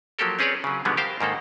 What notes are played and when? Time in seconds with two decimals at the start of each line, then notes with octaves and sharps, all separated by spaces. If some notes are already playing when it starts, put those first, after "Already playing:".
0.19 F3 F#3 A#3 G4 A4 A#4
0.39 C4 C#4 G#4 B4 C#5 D5
0.64 C#3 F#3
0.85 B2 D3 F3 G3 G#3 B3
0.97 G4 A#4 C5 F5 G5
1.21 G#2 D#3 A#3 A4